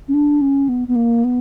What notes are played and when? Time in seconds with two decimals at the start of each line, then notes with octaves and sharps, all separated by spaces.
0.08 C#4
0.14 D4
0.41 C#4
0.69 B3
0.88 B3
0.96 A#3
1.24 B3